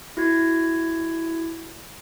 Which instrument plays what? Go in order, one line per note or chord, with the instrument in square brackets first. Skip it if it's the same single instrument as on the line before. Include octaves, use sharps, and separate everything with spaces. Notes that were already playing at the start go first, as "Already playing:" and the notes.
[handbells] E4 F#4 G#6